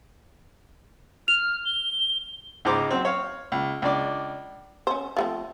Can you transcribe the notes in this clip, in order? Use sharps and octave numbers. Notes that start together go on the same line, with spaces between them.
F6 F7
G7
C#2 G#2 C5 A#5 D6
F#3 C4
C#5 F5
C#2
C#2 D4 D5
C#4 C5
F3 A3 C4